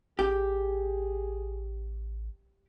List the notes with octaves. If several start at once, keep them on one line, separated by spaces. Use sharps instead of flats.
A1 G4 G#4